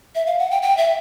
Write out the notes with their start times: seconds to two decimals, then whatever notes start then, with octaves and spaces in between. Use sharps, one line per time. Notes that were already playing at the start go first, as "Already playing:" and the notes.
0.15 E5
0.26 F5
0.39 F#5
0.51 G5
0.62 G5
0.77 E5